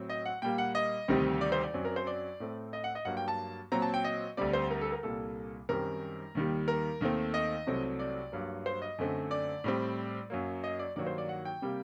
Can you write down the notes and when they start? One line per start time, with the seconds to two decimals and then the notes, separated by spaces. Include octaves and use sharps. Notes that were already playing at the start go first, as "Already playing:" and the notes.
Already playing: A2 F#3 C4
0.09 D#5
0.25 F#5
0.42 A#2 G3 A#3 G5
0.58 F#5
0.75 D#5
1.08 D2 C3 D#3 G3 C4
1.41 D5
1.52 C5
1.63 D5
1.74 F#2 F#3 C4
1.85 A#4
1.96 C5
2.07 D5
2.40 A2 A3 C4
2.73 D#5
2.84 F#5
2.95 D#5
3.05 G2 F#3 A#3 F#5
3.17 G5
3.28 A5
3.72 A#2 F#3 C4 A#5
3.82 A5
3.94 G5
4.04 D#5
4.37 D2 D3 G3 C4 D5
4.53 C5
4.70 A#4
4.81 A4
4.92 A#4
5.03 C2 A#2 G3 A#3 A4
5.69 F#2 D#3 G3 C4 A#4
6.35 D#2 D#3 G3
6.68 A#4
7.01 D#2 D#3 A3 C4
7.34 D#5
7.67 C2 C3 F#3 A3 C4
7.99 D5
8.32 G2 F#3 A#3
8.66 C5
8.82 D#5
8.98 F#2 D3 A3 C4
9.31 D5
9.64 A2 G3 C4
10.30 F#2 F#3 A#3
10.64 D#5
10.79 D5
10.96 G2 D#3 F#3 A#3 D5
11.07 C5
11.18 D5
11.29 F#5
11.45 G5
11.62 C3 G3 A#3